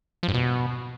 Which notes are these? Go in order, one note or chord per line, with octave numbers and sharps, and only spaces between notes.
F3
G2
B2